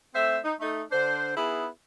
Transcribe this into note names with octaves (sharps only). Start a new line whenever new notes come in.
A3 C4 C5 E5
D#4
A3 D#4
D3 D4 C5
B3 D#4 E4 G#4